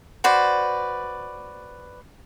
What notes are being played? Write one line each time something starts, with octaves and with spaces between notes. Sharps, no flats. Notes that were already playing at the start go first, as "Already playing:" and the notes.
F#4 B4 C5 D5